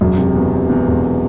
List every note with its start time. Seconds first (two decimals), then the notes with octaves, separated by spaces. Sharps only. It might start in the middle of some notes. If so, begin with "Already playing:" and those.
0.01 E1 F#2
0.18 C3
0.35 E2
0.53 C3
0.69 E2
0.87 E1